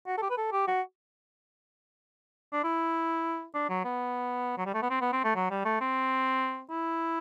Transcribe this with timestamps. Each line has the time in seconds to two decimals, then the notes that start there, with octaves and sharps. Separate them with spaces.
0.07 F#4
0.18 A4
0.22 G4
0.30 B4
0.38 A4
0.52 G4
0.68 F#4
2.53 D4
2.64 E4
3.54 D4
3.69 F#3
3.85 B3
4.58 F#3
4.66 G3
4.74 A3
4.82 B3
4.90 C4
5.01 B3
5.13 C4
5.24 A3
5.36 F#3
5.51 G3
5.65 A3
5.81 C4
6.71 E4